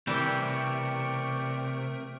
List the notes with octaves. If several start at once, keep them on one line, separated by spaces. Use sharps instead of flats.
C3 E3 G3 A3 A#4 D5 G5 C#6